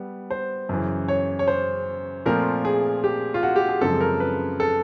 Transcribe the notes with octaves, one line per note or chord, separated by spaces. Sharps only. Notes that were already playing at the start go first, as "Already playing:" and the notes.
Already playing: G3 B3
C5
F#2 C#3 E3
C#5
C#5
C5
A#2 F3 A3 C4 A#4
G#4
G4
F4
F#4
G4
G#4
F#2 C#3 F3 G#3 C4 A4
A#4
B4
A4